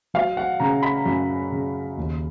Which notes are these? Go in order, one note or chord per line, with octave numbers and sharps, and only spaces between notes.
F#3 F5
F#5
C#3 A#5
B5
F#2
C#3
D#2